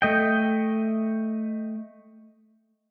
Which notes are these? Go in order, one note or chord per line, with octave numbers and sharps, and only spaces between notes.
A3 D#5 G5